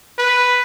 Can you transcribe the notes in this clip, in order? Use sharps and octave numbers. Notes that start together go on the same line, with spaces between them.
B4